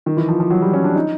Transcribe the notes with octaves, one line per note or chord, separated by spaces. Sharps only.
D#3
E3
F3
F3
F#3
G3
C#4
D4
D#4